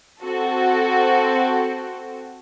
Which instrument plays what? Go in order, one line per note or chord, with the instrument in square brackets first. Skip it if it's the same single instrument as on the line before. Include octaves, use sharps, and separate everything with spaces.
[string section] C4 F#4 A4